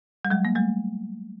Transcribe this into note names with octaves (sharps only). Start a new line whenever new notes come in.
G3
F#3 G#3
A#3
G3 A3